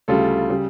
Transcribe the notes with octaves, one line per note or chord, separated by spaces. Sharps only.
D2 C#3 G3 F4 A4
C#3 G3